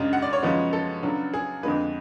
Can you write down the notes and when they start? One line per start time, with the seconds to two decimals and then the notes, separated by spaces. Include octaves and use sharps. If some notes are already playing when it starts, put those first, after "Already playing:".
Already playing: F#2 C#3 G#3 D4
0.13 F#5
0.22 D5
0.33 C#5
0.43 F#2 C#3 F3 G#3 B3
0.73 A4
1.03 C#3 F#3 B3 D4
1.34 G#4
1.63 F2 D3 G#3 B3 D4 B4